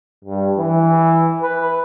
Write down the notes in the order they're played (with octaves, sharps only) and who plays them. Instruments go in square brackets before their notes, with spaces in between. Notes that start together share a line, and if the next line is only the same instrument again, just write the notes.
[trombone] G2
E3
B4